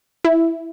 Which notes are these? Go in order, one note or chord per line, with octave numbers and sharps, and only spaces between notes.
E4